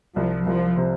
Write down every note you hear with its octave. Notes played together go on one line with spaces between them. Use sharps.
C2 F3
C2 F3
C3